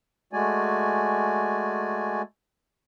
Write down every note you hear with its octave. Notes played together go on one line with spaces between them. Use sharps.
G#3 A3 F#4 D5 G#5